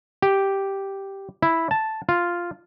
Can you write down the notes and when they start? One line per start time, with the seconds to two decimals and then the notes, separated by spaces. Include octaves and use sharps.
0.22 G4
1.42 E4
1.71 A5
2.09 F4